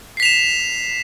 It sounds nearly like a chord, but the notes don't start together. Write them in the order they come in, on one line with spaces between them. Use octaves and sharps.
C7 B6 F7 E7